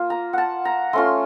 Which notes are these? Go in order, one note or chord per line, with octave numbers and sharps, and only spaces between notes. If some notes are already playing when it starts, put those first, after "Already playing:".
Already playing: A#3 F4
A#5
F#5 A5
A#5
A3 C#4 F4 C6